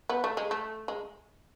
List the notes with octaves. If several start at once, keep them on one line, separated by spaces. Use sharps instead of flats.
B3
A3
G#3
A3
G#3